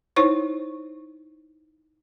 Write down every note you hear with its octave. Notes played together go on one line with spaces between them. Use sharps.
D#4 E4 C5 C#5 C#6